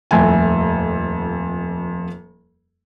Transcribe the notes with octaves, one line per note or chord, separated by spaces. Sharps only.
D#1 F2 A3 G#5